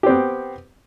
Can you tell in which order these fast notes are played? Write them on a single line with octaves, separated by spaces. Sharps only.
G4 C4 B3